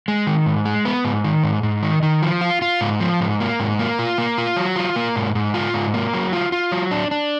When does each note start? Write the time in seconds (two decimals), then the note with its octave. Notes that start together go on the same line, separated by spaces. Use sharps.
0.08 G#3
0.27 D#3
0.46 G#2
0.65 G#3
0.85 B3
1.05 G#2
1.24 D#3
1.44 G#2
1.63 G#2
1.83 D#3
2.03 D#3
2.22 F3
2.41 F4
2.62 F4
2.81 G#2
3.00 F3
3.20 G#2
3.40 A#3
3.60 G#2
3.79 A#3
3.99 F4
4.18 A#3
4.38 F4
4.57 F#3
4.76 F4
4.96 A#3
5.16 G#2
5.35 G#2
5.54 F4
5.74 G#2
5.94 A#3
6.14 F#3
6.33 F4
6.52 F4
6.72 F#3
6.91 D4
7.11 D4